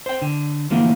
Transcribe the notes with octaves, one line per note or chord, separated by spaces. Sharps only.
C5 G5
D3
D3 E3 F3 A3 A#3